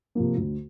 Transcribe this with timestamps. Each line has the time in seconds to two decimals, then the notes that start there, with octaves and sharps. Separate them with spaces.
0.15 C3 F3 A#3
0.37 D2